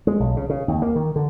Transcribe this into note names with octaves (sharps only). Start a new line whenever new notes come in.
G#3
B1
C#3
C#3
D#2
A#3
D#3
D3